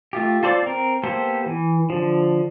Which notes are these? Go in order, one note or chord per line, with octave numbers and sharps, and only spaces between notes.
A3 F4 G4
F4 A4 C5 D5
C4 A#4
A#3 B3 G4 A4 C5
E3
D3 F3